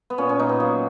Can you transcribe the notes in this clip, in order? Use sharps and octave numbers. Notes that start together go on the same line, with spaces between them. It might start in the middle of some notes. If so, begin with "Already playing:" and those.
B3
A#2 C#4
C#4
A#2 D#4
B3
F#3 A#3